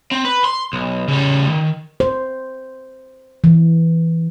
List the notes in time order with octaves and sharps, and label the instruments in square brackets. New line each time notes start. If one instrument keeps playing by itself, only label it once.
[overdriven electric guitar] C4
B4
C6
B1
C#3 G3
D#3
[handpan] C5
E3